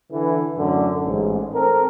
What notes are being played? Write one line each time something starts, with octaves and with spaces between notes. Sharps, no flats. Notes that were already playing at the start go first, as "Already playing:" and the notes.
D3 E3
F#2 A2 D3
A1 G#2
C4 A4 A#4